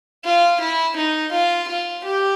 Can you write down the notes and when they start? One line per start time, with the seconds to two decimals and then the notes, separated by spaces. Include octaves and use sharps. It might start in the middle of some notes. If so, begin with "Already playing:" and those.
0.25 F4
0.60 E4
0.96 D#4
1.32 F4
1.68 F4
2.04 G4